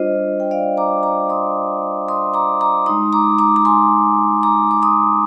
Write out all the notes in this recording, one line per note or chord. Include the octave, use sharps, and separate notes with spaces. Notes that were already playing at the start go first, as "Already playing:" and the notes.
Already playing: G3 D4 F4 C5 D#5
G5
D5 F5
A#5 D6
A#5 D6
C6 D#6
C6 D#6
A#5 D6
A#5 D6
G#3 D#4 C6 D#6
A#5 D6
A#5 D6
A#5
G#5 C6
A#5 D6
D6
C6 D#6